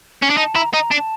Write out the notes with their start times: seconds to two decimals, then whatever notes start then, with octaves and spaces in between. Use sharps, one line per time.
0.22 C#4
0.30 D4
0.37 D#4 A5
0.55 E4 A#5
0.73 D#4 A#5
0.91 D4 A5